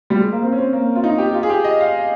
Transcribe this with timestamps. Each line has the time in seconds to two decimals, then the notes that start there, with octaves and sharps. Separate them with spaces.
0.10 G3
0.20 G#3
0.32 A#3
0.42 C4
0.52 C#4
0.58 C4
0.73 A#3
0.96 F4
1.04 D#4
1.18 G4
1.34 F4
1.43 G#4
1.50 G4
1.64 D#5
1.81 F5